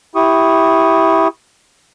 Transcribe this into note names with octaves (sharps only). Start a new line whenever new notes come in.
E4 G4 C#6 D#6